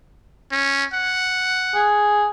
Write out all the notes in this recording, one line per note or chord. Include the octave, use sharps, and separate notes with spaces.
C#4
F#5
G#4